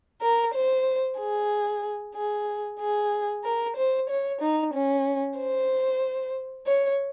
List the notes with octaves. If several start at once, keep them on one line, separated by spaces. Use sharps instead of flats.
A#4
C5
G#4
G#4
G#4
A#4
C5
C#5
D#4
C#4
C5
C#5